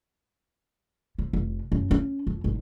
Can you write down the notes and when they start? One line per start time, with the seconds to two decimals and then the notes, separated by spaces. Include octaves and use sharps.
1.18 C3
1.33 F1
1.72 F#2
1.91 C#4
2.27 F2
2.44 G#1